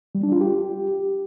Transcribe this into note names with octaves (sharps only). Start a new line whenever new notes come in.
G3
D4
F4
G4